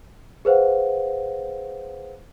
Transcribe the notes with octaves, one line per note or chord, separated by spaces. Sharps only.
G#4 B4 C5 F5 F#5